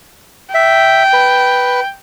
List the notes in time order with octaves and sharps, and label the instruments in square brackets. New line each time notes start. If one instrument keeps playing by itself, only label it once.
[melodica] E5 [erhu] G5
[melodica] B4